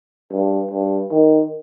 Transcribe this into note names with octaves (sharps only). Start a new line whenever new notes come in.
G2
G2
D#3